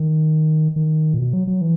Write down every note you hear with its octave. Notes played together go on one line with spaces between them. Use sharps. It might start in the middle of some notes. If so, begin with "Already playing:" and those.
Already playing: D#3
D#3
A#2
B2
F#3
F#3
E3